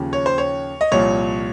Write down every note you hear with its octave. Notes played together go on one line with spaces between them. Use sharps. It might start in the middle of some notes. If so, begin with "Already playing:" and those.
Already playing: D#2 C#3 F3
C#5
C5
C#5
D#5
C2 A#2 F3 C#5